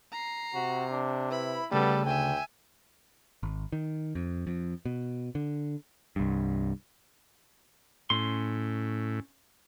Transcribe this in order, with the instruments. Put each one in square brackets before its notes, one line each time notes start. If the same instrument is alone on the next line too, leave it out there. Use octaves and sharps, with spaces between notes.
[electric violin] A#5 C7
[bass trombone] C3 [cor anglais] F#4
[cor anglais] D4
[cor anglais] E4 [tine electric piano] B4 [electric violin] B5
[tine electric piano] C#3 A3 [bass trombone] G3 [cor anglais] B3 [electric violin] A4 B4
[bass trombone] D2 [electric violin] E5 G#5 [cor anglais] G5
[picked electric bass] G#1
D#3
F2
F2
B2
D3
C2 G2
[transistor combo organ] A2 [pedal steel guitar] C#4 C6